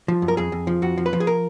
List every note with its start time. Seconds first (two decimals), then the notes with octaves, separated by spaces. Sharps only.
0.08 F3
0.22 F#2
0.28 A#4
0.37 F2 G#4
0.52 F2
0.67 F3
0.82 F2 F#4
0.98 F3
1.06 B4
1.13 F3
1.20 G#4
1.27 A#4